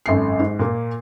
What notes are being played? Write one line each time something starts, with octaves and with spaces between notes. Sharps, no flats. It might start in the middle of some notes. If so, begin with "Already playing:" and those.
G#1 F#2 A4 C7
G#2
A#2 A#3